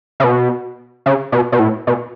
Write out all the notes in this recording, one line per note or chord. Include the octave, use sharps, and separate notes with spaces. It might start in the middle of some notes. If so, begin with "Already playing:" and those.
C#3
B2
C#3
B2
B2
A2
B2